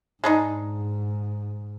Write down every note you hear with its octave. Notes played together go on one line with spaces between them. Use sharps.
G#2 G#3 D4 D#4